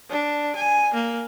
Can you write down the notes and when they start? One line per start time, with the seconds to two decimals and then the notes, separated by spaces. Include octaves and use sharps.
0.10 D4
0.56 G#5
0.94 A#3